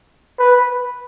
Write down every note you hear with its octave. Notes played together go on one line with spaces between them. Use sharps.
B4